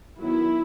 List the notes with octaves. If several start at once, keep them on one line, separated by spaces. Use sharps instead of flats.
D#3 F#3 B3 E4